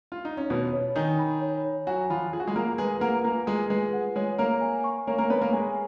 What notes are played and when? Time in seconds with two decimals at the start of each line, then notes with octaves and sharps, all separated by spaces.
0.12 F4
0.25 D#4
0.37 C#4
0.50 B2 B3 C#5
0.73 C#5
0.96 D#3 D#4 G#5
1.19 B5
1.41 C#5
1.64 C#5
1.87 F#3 F#4 G#5
2.10 F3 F4 B5
2.33 F4 G#4
2.40 F#4
2.47 G#3 G#4
2.56 A#3 F4 A#4
2.78 G#3 G#4 B4
3.01 A#3 A#4 F#5
3.24 A#3 F4 A#4
3.47 G#3 F4 G#4
3.70 G#3 G#4 B4
3.93 F#5
4.16 G#3 G#4 C#5
4.38 A#3 A#4 C#5
4.61 G#5
4.84 C#6
5.07 A#3 A#4 C#5
5.18 A#3 A#4
5.30 B3 B4 C#5
5.41 A#3 A#4
5.53 G#3 G#4 G#5